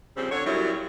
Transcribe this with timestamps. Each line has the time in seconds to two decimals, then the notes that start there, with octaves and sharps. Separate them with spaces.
0.17 C#3 F3 G3 C4
0.31 D3 C#5
0.46 F#2 A#2 F#3 G3 E4